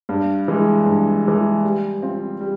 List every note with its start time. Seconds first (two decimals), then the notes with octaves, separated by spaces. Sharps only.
0.09 G2
0.48 E3 G#3
0.86 G2
1.25 E3 G#3
1.64 G3
2.02 C4 F4
2.41 G3